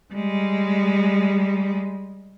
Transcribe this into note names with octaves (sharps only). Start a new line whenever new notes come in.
G3 G#3